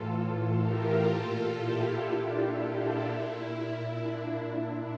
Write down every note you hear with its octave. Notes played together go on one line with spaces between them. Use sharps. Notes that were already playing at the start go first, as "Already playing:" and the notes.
Already playing: A2 E3 F4 A4
G4 A#4
A#2 F4 A4
E4 G4
D4 F4
A#2 E4
D4